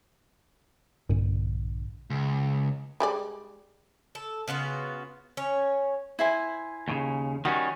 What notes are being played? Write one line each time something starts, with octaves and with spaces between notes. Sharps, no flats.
A#1 G2 D3
C#2
G3 G#3 D5
A4
C#3 B3 F4 F#4
C#4 C#5
E4 C5 G#5
D#2 A2 C#3
D#3 G3 C#4 F#4